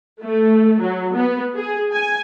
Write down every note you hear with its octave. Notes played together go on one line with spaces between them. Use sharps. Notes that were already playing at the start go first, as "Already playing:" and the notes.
A3
F#3
B3
G#4
G#5